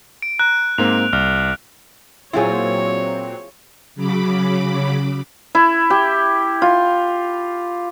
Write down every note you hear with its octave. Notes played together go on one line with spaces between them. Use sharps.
D7
A#5 F#6
G#2 A#3 C4 F7
C2 F6
A#2 F#3 C4 E4 F4 G#4 C#5
C#3 F#3 B5 D6
E4
G4
F4